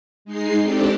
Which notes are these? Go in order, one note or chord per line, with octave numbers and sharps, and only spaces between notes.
G#3 D#4 C7
C4 D4 G4 A4